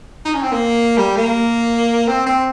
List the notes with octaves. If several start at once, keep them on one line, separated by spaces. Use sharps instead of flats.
D#4
C#4
C4
A#3
G3
A#3
C4
C4